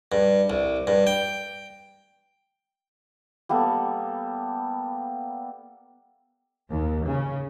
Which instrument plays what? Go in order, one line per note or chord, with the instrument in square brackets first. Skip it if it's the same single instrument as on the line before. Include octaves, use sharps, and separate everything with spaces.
[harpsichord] G2
C2
G2
G5
[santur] G3 A#3 B3 A4
[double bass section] D#2
C#3